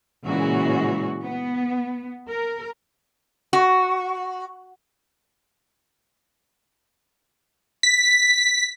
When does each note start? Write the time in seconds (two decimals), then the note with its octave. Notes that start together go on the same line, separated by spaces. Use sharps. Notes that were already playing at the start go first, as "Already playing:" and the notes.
0.24 A#2 C#3 E3 G#3 F#4
1.23 B3
2.29 A#4
3.53 F#4
7.83 B6